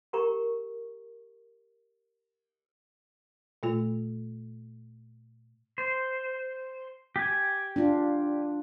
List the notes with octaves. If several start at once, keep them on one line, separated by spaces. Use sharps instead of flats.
G4 A#4 G5 A#5 C#6
A#2 A3 F4
C5
G4 G#5
D4 F4